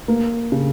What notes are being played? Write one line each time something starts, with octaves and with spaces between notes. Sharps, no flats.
A#3
C#3